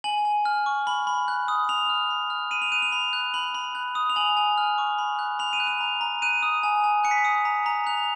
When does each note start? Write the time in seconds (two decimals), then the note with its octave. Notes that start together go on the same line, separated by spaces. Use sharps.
0.04 G#5 F#7
0.25 G#5
0.45 F6
0.66 C#6
0.87 B5 F#7
1.07 B5
1.28 F#6
1.48 D#6
1.69 B5 F7
1.89 F6
2.10 B5
2.30 F6
2.51 B5 D#7
2.62 F7
2.72 F#6 D#7
2.82 F7
2.92 B5
3.13 F#6
3.34 B5 F#7
3.54 B5
3.75 F#6
3.95 D#6
4.10 F7
4.16 G#5 F#7
4.37 G#5
4.58 F6
4.78 C#6
4.98 B5
5.19 F#6
5.39 B5 F7
5.53 D#7
5.60 F#6
5.67 F7
5.81 A#5
6.01 A#5
6.22 F#6 D#7
6.43 D#6
6.63 G#5
6.84 G#5
7.04 F#6 C#7
7.11 B6
7.18 C#7
7.25 D#6
7.45 A#5
7.66 A#5
7.87 F#6 F7